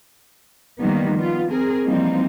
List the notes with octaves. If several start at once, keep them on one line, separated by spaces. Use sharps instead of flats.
D#3 F3 G3 A#3 B3
B3 F4
C4 G#4 A#4
E3 F3 G3 A#3 C4 D#4